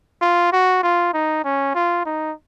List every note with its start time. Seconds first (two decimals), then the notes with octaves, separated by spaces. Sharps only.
0.22 F4
0.52 F#4
0.83 F4
1.14 D#4
1.44 C#4
1.75 F4
2.06 D#4